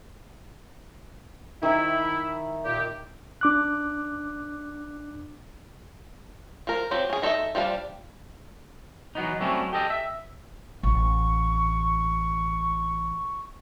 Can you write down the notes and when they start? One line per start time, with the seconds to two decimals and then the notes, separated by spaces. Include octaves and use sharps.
1.63 D#3 E4 E5 A#5
2.65 A#2 G4
3.41 D4 D6 F#6
6.67 F3 A#4
6.91 F3 F#3 C4 G4
7.10 C#4 G#4
7.22 D#4 A4 C#5 D#5 E5
7.55 F3 G3 D4 F5
9.15 E3 F#3 B3 D#4
9.39 F#3 G3 A3 C4 C#4 E4
9.73 G4 A4 D#5 G5
9.90 E5
10.83 A1 C#6